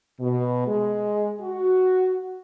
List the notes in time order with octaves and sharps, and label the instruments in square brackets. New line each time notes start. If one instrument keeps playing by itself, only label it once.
[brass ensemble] B2
G#3
F#4